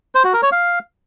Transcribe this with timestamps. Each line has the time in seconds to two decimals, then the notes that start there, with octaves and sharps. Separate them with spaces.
0.15 C5
0.24 F#4
0.33 A#4
0.43 C#5
0.52 F5